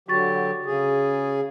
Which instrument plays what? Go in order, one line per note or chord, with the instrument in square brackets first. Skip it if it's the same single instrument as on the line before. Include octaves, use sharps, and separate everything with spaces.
[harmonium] D3 F#3 G4 [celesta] F#4 C#6 A6
[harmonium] C#3 G#4